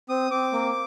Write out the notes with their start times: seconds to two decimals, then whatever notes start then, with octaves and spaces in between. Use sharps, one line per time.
0.09 C4 D#6
0.31 C4 D6
0.53 A#3